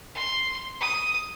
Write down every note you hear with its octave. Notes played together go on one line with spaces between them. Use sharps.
C6
D#6